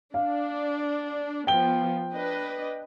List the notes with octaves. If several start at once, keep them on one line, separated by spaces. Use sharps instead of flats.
D4 F5
F3 B3 G5 G7
D4 B4 D#5